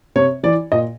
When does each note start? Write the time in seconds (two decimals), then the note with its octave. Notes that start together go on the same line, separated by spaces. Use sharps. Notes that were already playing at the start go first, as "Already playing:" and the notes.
0.16 C3 C#5
0.43 E3 D5
0.72 A#2 D#5